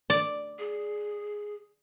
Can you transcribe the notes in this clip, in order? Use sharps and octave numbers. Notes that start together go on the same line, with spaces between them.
D5
G#4